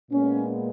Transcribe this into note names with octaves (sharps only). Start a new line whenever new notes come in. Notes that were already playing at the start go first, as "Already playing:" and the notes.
A#2 G#3 B3 C#4